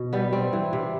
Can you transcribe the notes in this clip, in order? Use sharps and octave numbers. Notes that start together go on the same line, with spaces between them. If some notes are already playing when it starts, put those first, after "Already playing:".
Already playing: B2
G3 B3
G3 C4
E3
C3